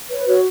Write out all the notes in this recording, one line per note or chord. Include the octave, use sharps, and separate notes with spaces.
B4 C#5
F#4 C#5